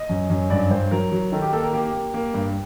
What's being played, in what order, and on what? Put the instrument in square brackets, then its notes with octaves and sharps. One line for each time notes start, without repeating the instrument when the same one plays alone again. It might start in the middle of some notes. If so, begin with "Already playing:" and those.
Already playing: [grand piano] D#5
F#2
F#2
G2 D5
G2 C5
F#3 A#4
F#3
D#3 A4
G4
A#3 A4
A#4
A#3 G4
A#3
A#3
G2